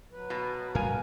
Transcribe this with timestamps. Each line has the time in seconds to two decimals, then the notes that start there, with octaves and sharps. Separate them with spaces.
0.12 F#3 B4
0.30 B2
0.75 G#2 G3 A#3 A#4 F5 G#5